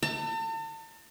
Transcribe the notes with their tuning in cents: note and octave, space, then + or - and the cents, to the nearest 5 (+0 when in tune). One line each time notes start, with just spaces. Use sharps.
A5 +40